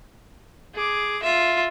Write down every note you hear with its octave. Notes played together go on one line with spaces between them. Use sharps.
G#4 D6
F4 E5